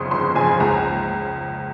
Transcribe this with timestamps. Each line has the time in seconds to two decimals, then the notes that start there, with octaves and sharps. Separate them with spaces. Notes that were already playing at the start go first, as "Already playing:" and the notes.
Already playing: G1 F2 C#3 C6 C#6 D#6
0.11 G1 C6
0.35 F2 C#3 G#5
0.60 C#2 A#5